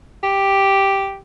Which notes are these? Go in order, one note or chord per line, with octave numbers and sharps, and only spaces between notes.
G4